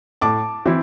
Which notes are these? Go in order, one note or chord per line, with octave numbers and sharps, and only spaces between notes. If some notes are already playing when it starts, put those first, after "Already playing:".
A2 A5 D6
E3 C4 E4